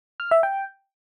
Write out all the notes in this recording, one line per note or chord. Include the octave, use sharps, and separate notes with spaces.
F6
E5
G5